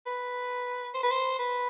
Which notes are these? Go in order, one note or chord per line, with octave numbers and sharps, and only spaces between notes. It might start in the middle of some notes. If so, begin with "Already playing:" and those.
B4
C5
B4
C5
B4